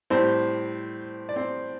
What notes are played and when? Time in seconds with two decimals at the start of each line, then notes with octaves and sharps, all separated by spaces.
0.10 A2 G3 C4 C5
1.29 D5
1.36 C4 C5